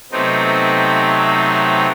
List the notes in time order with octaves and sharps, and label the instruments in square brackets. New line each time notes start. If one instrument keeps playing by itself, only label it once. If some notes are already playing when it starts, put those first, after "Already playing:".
[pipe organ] C3 F#3 A3 B3 C4 D#4